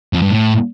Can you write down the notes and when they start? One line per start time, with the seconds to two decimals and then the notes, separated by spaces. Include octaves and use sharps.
0.13 F2
0.22 G2
0.31 A2